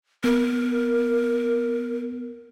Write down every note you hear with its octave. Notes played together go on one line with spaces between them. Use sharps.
B3 A#4